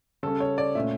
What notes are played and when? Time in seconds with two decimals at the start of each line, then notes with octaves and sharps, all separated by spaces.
0.23 C#3 G3 C#4 A4
0.40 C#5
0.58 D5
0.75 A#2 A3 C#4 E5